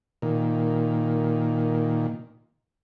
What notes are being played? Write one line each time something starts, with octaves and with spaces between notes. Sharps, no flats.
A#2 D#3